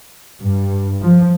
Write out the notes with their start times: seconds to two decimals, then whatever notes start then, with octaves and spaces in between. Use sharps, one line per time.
0.41 G2
1.02 F3